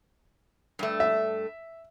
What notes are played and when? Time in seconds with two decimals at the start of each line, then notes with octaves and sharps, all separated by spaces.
0.79 G2 A3
1.00 E5